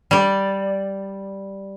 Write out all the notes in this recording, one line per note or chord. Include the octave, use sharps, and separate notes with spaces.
G3 D5